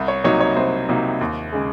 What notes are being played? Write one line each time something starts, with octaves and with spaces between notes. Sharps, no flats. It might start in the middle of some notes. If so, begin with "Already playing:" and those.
Already playing: C2
C#5
C3 F#3 A#3 D#4 C#5
C#5
C2 C5
C3 F#3 A#3 D#4
D#2
C#3 G#3